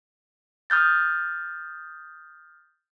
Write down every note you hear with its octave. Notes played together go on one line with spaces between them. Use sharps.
D#6 F6 G6 A6